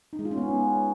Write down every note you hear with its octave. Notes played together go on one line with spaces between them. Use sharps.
D#4
G#3
F4
C#4
B3